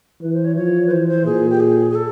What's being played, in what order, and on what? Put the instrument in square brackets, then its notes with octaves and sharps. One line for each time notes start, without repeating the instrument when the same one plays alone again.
[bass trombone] E3 [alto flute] B4
[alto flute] C5
C#5
[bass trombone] F3 [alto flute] C#5
[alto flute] B4
[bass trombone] E3 [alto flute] C5
[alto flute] C5
[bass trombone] A#2 [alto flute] G#4
[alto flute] G4
G#4
G#4
A4